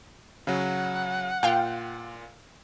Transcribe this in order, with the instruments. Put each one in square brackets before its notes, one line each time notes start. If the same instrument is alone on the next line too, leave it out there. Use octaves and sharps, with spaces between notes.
[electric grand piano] C#3 F#3 [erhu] F#5
[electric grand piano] A#2 F4 [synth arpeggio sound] F5 G5